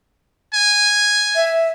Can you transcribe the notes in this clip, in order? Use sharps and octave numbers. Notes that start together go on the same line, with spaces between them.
G#5
E5